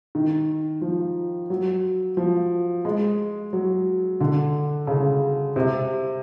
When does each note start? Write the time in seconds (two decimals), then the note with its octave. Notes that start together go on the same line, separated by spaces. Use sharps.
0.15 D#3
0.81 F3
1.50 F#3
2.17 F3
2.85 G#3
3.53 F#3
4.20 D3
4.87 C#3
5.56 C3